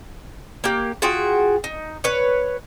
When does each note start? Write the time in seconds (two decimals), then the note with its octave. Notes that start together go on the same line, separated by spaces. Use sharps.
0.64 A#3 G4
1.02 F4 F#4 G#4 G5
1.64 D#4
2.04 B4 C#5